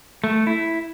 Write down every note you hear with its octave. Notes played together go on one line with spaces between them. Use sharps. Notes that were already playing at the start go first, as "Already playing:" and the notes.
A3
E4